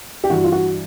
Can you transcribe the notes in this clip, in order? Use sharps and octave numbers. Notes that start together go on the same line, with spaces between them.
G4
G2 E3 F#4
F4
F#4